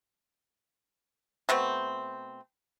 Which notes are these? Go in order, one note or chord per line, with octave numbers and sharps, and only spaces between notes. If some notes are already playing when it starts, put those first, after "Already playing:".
B2 A3 C4